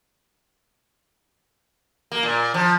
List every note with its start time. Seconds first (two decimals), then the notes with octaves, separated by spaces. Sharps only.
2.12 A#3
2.23 A#2
2.54 F3